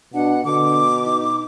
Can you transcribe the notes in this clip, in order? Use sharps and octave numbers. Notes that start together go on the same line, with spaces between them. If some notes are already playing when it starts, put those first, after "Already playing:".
B2 D4 F#5
B2 D3 D6
D#4